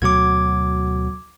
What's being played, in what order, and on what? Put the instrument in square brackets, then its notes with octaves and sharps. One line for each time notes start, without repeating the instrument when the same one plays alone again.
[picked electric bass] D2 B2 F#3 [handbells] D6 G#6